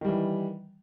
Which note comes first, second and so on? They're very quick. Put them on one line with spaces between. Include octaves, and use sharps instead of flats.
D#3 G3 E3